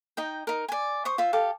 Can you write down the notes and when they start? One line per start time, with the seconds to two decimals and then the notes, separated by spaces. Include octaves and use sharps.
0.17 D#4 D#5 G5
0.47 D#4 A#4
0.68 D5 G#5
1.05 C5 C#6 D#6
1.18 F4 C5 E5
1.33 G4 A4 F5